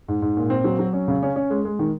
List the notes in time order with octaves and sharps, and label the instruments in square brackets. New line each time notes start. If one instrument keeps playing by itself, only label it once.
[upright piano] G#2
G#2
A#2
C4
F#3
F#3
C#4
C#3
C#4
C#4
G#3
G#3
D#3